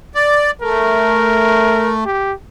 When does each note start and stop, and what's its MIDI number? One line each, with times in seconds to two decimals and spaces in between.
0.15 0.51 74
0.62 2.04 57
0.62 1.94 70
2.06 2.32 67